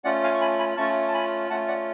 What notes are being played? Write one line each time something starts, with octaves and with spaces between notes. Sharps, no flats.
A3 C#4 F4 D5 F#5
F5 G#5
C#6
G#5 B5
G#5 B5
A3 C#4 F4 A5 C#6
A5
G#5 B5
A3 C#4 F4 F#5 A5
D5 F#5